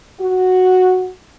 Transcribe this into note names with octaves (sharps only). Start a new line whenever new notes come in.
F#4